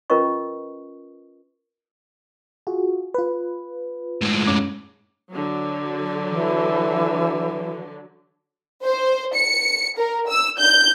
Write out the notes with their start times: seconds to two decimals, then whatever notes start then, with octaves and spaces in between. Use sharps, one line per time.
0.10 C#4 F4 A#4 B4 D#5 C#6
2.67 F4 F#4 G#4
3.14 F4 B4
4.22 A2 G#3
4.47 F#2 C#4 D6
5.30 D3 F#3
6.30 E3
8.84 C5
9.34 C#7
9.97 A#4
10.28 E6
10.58 G6